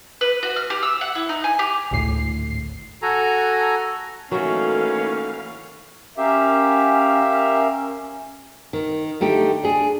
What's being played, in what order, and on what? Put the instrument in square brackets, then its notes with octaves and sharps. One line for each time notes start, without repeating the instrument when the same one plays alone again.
[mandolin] B4
F#4
F6
G4
E6
F#5
E4
D#4
G#5
G4
[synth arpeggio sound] G#1 D2 A2 C7
[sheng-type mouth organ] F#4 A4 G#5 A#5
[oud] D#3 A3 [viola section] E3 A#3 F5 [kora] F#3 [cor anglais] C#4
[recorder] C#4 [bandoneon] G4 [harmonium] A#4 E5 F5
[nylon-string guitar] D#3
D3 A3 D#4 G4
D4 G#4